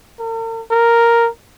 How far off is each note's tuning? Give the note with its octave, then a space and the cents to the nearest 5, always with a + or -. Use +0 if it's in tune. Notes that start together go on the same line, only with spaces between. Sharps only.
A#4 -45
A#4 +0